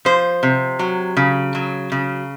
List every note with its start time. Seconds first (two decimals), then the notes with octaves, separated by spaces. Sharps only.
0.05 F3 C5
0.43 C3
0.79 F#3
1.17 C#3
1.55 F#3
1.92 C#3